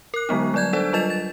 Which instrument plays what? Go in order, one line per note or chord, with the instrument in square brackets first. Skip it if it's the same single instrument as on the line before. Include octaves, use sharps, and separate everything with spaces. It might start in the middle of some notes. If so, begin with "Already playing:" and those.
[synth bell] A#4 F#6
D3 F#3 G#3 B3 D#4
F#3 G3 D5 G6 G#6
D4 A4 C5 D5
F#3 G3 F4 D#5 A6 E7
A6